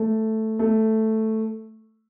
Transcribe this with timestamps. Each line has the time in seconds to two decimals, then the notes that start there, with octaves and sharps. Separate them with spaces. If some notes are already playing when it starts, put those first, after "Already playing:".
Already playing: A3
0.59 A3